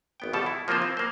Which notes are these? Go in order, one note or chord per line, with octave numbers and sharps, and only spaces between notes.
G#1 B3 G5
B2 G3 A4 A5
E4
F3 A#3 C4 F4 C5
C4
A#3 C5